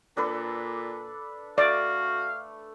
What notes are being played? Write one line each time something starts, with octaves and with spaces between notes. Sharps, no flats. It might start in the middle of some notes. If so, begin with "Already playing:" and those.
A#2 D4 A4 B4
A3 F#4 D5 F5